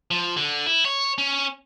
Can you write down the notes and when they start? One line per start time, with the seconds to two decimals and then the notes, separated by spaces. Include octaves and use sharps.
0.11 F3
0.37 D3
0.66 E4
0.85 C#5
1.18 C#4